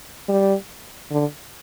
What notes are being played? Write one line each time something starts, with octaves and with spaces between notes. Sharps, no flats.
G3
D3